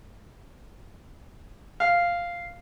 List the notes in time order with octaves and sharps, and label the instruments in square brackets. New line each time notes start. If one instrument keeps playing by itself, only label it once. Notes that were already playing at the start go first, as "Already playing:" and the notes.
[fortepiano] F5